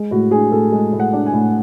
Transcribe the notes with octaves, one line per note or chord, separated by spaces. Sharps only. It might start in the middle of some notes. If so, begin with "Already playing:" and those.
Already playing: G#3
A2 F#4
D4 G#4
A2 A4
G#3
A2
F#5
D4
G#5
A2